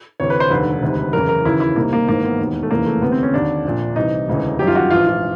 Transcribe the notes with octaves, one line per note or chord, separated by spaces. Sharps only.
D2 C3 E3 C#5
B4
C5
F1 D#2 D3 B4
E1 D2 C3 D#3
F#1 E2 C#3 E3 A#4
A#4
D#2 C#3 E3 E4
E4
C2 C3 D#3 A#3
A#3
G#1 G#2 E3 A#3
B3
E1 D#2 D#3
A3
F1 E2 C#3 E3 A#3
A3
D2 C3 E3 B3
C4
C#4
D#2 D3 D4
A#1 A#2
C2 C3 E3 D#4
E1 D2 C#3 E3
G1 F#2 D#3 G4
F4
F#4
A#1 G#2 E3 F4
F4